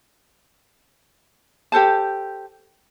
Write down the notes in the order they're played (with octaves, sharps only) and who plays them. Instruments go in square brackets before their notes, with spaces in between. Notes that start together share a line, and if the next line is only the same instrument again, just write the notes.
[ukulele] G4 A4 C5 A5